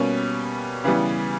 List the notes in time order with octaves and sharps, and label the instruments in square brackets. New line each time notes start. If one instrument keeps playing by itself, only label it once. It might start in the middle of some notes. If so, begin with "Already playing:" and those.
Already playing: [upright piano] B2 G3 A#3 C#4
C#3 E3 G3 B3